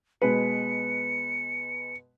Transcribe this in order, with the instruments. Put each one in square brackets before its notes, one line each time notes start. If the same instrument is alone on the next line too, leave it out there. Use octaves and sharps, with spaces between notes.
[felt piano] B2 G#3 B4 [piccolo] C#7